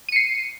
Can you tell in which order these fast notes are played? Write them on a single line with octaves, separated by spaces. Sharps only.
D#7 C#7 C7